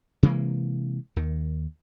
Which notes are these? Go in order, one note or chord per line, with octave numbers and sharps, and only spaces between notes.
C3 E3 G#3 A#3
D#2 D#3